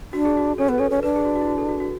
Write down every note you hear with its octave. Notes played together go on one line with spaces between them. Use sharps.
D4 F#4
G#4
F#4
C#4 A4
B3 B4
C#4 A4
C#4
D4 B4
G#4
F#4
F#4
E4
F#4
A4
F#4
F#4